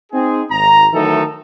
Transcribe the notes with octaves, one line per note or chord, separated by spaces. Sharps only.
C4 D#4 G#4
G#1 A#5
D#3 E3 F#3 A3 D#4 A4